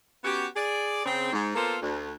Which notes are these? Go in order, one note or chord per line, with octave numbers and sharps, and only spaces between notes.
B3 C#4 F#4 G4
G#4 D5
C#3 C4
G#2
A#3 B3 F4 A4 C5
D2